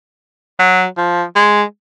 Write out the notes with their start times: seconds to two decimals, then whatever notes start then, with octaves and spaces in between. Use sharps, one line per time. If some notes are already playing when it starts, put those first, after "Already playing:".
0.59 F#3
0.97 F3
1.36 G#3